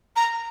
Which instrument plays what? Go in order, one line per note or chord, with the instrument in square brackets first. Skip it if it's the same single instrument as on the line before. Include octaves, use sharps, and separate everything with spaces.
[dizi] A#5